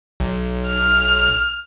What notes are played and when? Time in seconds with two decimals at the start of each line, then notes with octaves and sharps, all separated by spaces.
0.20 B1
0.67 F6